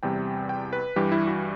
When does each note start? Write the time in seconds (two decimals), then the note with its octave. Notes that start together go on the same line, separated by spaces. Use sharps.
0.03 E2 C3 G3 G5
0.49 G5
0.73 B4
0.96 G2 E3 G3 G4
1.12 E4
1.27 F#4